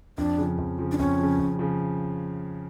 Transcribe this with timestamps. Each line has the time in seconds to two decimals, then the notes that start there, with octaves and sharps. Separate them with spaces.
0.18 F2 D4
0.38 C#3 F3
0.58 F2
0.79 C#3 F3
0.92 D4
0.98 F2 C#4
1.19 C#3 F3
1.39 F2
1.59 C#3 F3